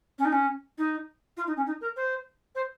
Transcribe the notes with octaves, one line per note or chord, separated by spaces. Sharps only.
C#4
D#4
C#4
D#4
F4
D#4
C#4
D#4
A#4
C5
C5